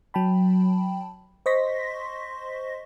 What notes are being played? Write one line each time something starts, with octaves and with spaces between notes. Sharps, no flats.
F#3 G5 A5 B5
C5 D#5 C6 C#6 A#6 B6